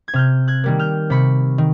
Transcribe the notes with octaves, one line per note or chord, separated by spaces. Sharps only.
G#6
C3 F6 G6
F#6 G#6
D#3 G3 A#3
F6 G6
C3 B5 C#6
D#3